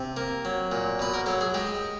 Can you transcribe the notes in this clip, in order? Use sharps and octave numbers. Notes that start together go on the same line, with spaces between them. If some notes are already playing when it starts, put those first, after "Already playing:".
Already playing: C3
A#3
F#3
A#2
B2 B4
A#4
F#3 A4
G#4
G#3 G4